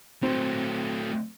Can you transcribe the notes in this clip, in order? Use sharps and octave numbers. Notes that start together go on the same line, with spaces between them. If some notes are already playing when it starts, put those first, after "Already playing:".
F#3 A3 C4